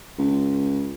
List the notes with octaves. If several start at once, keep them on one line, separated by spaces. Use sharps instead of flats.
C#2